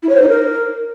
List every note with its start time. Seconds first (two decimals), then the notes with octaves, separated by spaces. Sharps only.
0.03 E4
0.09 C#5
0.16 C5
0.22 D#4
0.28 A#4